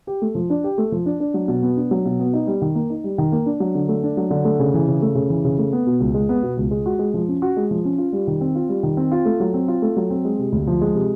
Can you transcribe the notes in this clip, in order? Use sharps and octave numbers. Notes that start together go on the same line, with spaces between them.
G4
A3
F3
D4
G4
A3
F3
D4
D4
F#3
B2
B3
D4
F#3
B2
B3
D#4
G3
D#3
A#3
D#4
G3
D#3
A#3
D4
F#3
D3
A3
D4
F#3
D3
A3
C#3
E3
C#3
A3
C#3
E3
C#3
A3
B3
B2
C#2
G#3
B3
B2
C#2
G#3
F#4
G#3
F3
C#4
F#4
G#3
F3
C#4
F4
G3
D#3
C4
F4
G3
D#3
C4
F4
A3
F#3
C4
F4
A3
F#3
C4
G#3
C3
D2
F3
G#3
C3